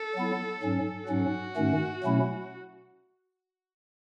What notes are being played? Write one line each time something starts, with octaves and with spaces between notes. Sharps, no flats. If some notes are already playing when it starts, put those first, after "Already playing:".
Already playing: A4
F#3 B3 E4
G#2 F#3 C#4
G#2 F#3 C#4 F#4
G#2 D#3 A3 C#4
B2 F#3 A3 C#4 E4